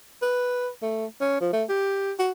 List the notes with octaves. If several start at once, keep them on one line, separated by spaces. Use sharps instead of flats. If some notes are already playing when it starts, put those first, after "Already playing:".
B4
A3
C#4
F3
A3
G4
F#4